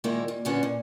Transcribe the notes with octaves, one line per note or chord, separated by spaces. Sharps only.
A#2 D#3 G#3 A#3 E4
A#2
A#2 D3 F#3 B3 C#4 D4
A#2